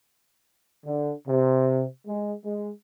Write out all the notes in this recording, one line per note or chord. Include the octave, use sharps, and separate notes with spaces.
D3
C3
G#3
G#3